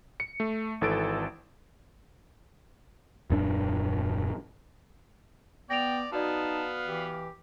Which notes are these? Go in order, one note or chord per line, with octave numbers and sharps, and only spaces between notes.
C#7
A3
G#1 E3 A4 A6 D7
D#1 F#2 D4
B3 D5 G5 A#6 D7 F7
B3 D#4 F#4 D5 F5 A5
E3 G4